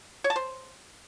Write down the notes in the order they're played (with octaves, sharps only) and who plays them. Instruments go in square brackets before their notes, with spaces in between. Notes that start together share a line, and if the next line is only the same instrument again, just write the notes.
[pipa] C#5
A5
C5